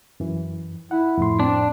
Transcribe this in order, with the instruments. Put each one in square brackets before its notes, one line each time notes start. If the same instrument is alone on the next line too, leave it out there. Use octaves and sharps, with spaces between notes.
[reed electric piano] F#2 E3
[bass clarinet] E4 [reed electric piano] F#5
[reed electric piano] F2 A2 C6
[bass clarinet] C4 [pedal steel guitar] D4